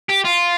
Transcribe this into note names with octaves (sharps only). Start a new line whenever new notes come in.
G4
F4